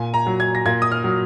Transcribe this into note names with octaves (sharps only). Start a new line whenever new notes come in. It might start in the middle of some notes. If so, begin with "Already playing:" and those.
Already playing: A#2 G#5
A#5
F#3
G#6
A#6
A#2 G#6
D#6
F6
F#3